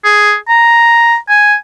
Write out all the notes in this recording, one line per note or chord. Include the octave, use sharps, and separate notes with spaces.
G#4
A#5
G#5